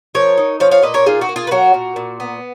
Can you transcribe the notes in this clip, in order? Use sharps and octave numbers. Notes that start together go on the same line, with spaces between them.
F3 A#4 C#5
D#4
F3 C#5 F5
C#5 F5
A#2 B4 D#5
A#4 C#5
D#4 F4 G#4
F#4
A#3
F4 G#4
B4
F#3 F#4 A#4
A#2
A#2
B3